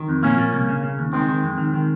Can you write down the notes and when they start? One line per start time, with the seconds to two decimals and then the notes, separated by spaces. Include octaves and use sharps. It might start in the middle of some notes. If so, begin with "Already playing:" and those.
Already playing: D#3
0.09 F2
0.23 A#2 A#3 C#4
0.38 A#2
0.53 C2
0.68 C#3
0.83 C#3
0.99 D#2
1.13 D#3 G#3 C4
1.29 D#3
1.43 F2
1.58 D#3
1.74 D#3